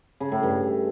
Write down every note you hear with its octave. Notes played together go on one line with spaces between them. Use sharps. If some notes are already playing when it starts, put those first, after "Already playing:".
C#3
A2
G2